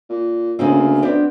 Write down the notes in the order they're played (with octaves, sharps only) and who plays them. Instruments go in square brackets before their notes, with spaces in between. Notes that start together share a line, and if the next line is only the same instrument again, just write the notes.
[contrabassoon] A#2
[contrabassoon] D2 [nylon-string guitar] C#3 A#3 C4
[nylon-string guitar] B3 C4 D4